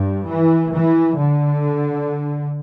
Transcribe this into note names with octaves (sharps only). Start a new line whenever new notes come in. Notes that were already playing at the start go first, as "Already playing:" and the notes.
Already playing: G2
E3
E3
D3